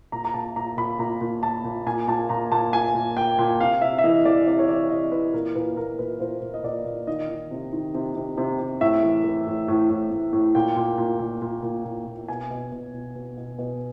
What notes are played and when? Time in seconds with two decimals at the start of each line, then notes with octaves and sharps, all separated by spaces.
0.12 A#2 A#5
0.25 A#5
0.34 A#2 A5
0.56 A#2 A#5
0.77 A#2 B5
0.99 A#2 A#5
1.21 A#2
1.43 A#2 A5
1.64 A#2
1.86 A#2 G#5
2.08 A#2 A5
2.29 A#2 A#5
2.51 A#2 A5
2.73 A#2 G#5
2.94 A#2
3.17 A#2 G5
3.38 A#2
3.60 C3 F5
3.81 C3 E5
3.98 E5
4.04 E3 D#5
4.25 E3 D5
4.47 C3 D5
4.59 C#5
4.69 E3 D5
4.90 C3 D#5
5.12 E3 B4
5.33 A#2 A#4
5.55 A#2 B4
5.77 A#2 A#4
5.99 A#2 B4
6.20 A#2 C5
6.42 A#2
6.54 D#5
6.64 A#2 D5
6.85 A#2
7.07 D#3 D#5
7.29 D#3
7.51 C3
7.73 D#3
7.95 C3
8.16 C3
8.38 C3
8.59 C3
8.81 A2 E5
9.03 E3
9.24 E3
9.47 A2
9.68 A2
9.90 A2
10.11 A2
10.33 A2
10.55 A#2 G5
10.77 A#2
10.98 A#2
11.20 A#2
11.42 A#2
11.63 A#2
11.85 A#2
12.07 A#2
12.28 B2 G#5
12.50 B2
12.72 B2
12.94 B2
13.15 B2
13.37 B2
13.58 B2